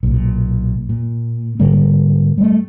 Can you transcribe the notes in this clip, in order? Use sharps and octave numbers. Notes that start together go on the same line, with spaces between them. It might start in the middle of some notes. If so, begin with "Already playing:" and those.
B1 A#2
A#2
G#2 D3 G3 A#3
G3 A3